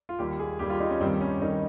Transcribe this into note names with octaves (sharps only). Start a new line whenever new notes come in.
F4
D#2 D#3 G3 G4
G#4
D#2 D#3 G3 G4
F4
D#4
C#4
G2 D#3 G3 C4
C#4
D#3 G3 D#4